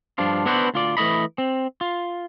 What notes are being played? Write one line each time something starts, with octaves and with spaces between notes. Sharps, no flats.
G2 F3 D4 F4
B3 D4 E4 F#4 B4 C5
D2 F4 D5
E3 A3 E4 D#5 B5
C4
F4